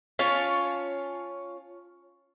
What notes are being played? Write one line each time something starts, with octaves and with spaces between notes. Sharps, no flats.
C#4 F4 C#5 A5